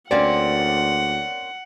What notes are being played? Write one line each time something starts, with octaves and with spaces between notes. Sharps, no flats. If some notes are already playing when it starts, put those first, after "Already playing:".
D2 A#3 C4 C#4 D5 F#5